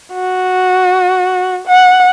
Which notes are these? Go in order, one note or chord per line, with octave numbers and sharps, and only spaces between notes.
F#4
F#5